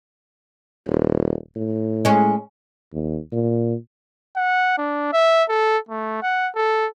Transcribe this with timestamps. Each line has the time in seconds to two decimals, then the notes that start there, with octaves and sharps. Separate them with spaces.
0.87 D#1
1.56 A2
2.05 G#3 C#4
2.93 D#2
3.32 A#2
4.36 F#5
4.78 D4
5.13 E5
5.49 A4
5.89 A3
6.23 F#5
6.56 A4